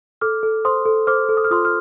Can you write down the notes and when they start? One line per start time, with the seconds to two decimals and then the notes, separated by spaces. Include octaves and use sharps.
0.21 A4 D6 F6
0.43 A4
0.65 C5 C6 D#6
0.86 A4
1.07 C5 D6 F6
1.29 A4
1.37 D#6
1.44 F6
1.51 F4 C6 D#6
1.65 F6